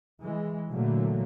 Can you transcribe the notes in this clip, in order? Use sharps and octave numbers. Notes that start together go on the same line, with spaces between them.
E3 G#3
A#2 D3 E3 F#3 A3 A#3